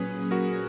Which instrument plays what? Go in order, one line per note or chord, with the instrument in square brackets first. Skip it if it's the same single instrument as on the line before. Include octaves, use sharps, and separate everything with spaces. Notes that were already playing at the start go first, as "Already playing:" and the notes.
Already playing: [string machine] A#2 F#3 C#4 [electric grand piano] G#4 B4
[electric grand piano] F#4 A#4